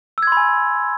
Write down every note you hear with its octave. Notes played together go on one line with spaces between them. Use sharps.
G#5 B5 C6 E6 G#6